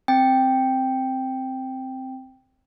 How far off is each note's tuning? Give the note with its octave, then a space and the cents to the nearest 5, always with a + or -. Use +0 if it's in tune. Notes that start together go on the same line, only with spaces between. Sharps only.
C4 +0 G5 +0